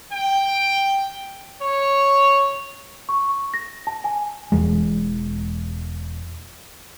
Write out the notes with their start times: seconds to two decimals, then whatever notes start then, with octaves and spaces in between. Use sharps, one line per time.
0.12 G5
1.61 C#5
3.09 C#6
3.54 A#6
3.87 A5
4.04 G#5
4.52 E1 E2 G#3